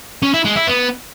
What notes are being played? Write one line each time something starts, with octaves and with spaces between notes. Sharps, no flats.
C#4
E4
G#3
E4
B3